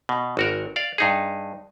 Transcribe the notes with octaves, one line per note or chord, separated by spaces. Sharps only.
B2
G#1 F#4 A#4
D5 F5
G2 D#4 G#4